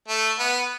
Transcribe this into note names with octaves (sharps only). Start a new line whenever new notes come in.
A3
B3